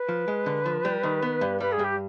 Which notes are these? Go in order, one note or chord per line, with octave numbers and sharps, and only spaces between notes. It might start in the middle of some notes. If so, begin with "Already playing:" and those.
Already playing: B4
F3
G#3
D3
F3
G3
D#3
B3
G2
G3 B4
G#4
G2 G4